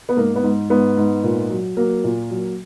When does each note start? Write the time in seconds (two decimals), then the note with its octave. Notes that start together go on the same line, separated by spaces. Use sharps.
0.09 B3
0.17 G#2 A#3
0.36 B3
0.43 G#2
0.70 G#2 B3
0.97 G#2
1.24 A#2
1.50 F#3
1.77 F#3 A#3
2.04 A#2
2.30 F#3